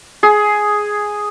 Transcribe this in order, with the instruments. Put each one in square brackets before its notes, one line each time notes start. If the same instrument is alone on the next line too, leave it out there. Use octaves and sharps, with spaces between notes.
[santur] G#4